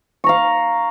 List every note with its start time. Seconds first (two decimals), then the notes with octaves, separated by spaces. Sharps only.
0.24 C#6
0.26 A#5
0.29 F5